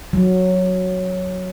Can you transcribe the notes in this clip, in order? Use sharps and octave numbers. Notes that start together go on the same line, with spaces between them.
F#3